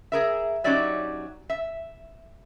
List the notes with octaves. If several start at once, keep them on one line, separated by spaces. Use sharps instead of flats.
G#4 A#4 E5
F#3 C#4 D#4 G4 D5 E5
E5